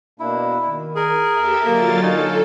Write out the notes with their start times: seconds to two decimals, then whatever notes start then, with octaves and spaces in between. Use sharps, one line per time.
0.20 B2 A#3 D4 E4
0.66 D#3
0.96 G#4 A#4
1.33 D#2 G4 A4 E5
1.65 D3 F#3 A#3 F4 A#5 A6
2.03 D#4 A4 C#5 F5 G#5